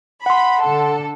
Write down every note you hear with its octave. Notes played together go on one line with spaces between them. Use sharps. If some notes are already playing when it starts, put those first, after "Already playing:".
F#5 B5 C6
D3 A4